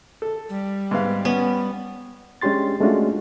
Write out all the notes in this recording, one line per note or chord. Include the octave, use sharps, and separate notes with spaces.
A4
G3
G#2 B3 F5
B3 C#4
G#3 C#4 D4 G4 C6 A6
G#3 A3 C#4 D4 F4 F#4